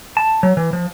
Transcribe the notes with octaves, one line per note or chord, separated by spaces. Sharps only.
A5
F#3
E3
F3